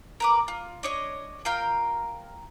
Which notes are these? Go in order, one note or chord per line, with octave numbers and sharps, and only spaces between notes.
A#4 B4 D6
F4
D4 C#5 D#5
F4 A#4 F5 G5